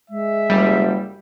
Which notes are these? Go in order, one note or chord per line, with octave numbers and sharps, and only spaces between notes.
G#3 E5
F#1 G3